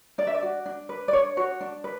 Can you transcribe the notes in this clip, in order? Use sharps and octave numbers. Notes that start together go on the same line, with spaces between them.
D4 D5
E5
D5
F#4
D4
B4
D5
D4 C#5
F#4 C#5
D4
B4